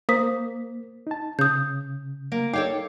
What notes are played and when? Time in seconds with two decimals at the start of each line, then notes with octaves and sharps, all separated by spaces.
0.09 A#3 C5 D#6 B6
1.07 D#4 A5
1.39 C#3 D#6 G6
2.32 A#3
2.53 D#4 A4 C#5 F5 G5 D6